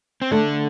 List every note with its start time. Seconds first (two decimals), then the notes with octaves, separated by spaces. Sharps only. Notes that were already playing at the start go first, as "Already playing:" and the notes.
0.22 C4
0.31 D3 A3 D4